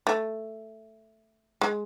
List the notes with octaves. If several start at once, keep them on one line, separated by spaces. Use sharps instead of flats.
A3
G#3